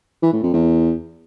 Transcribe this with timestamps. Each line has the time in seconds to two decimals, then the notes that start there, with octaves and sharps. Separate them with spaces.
0.22 E3
0.33 A2
0.43 F2
0.53 E2